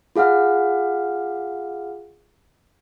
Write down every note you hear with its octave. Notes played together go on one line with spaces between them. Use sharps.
F4 G#4 F5 F#5 F6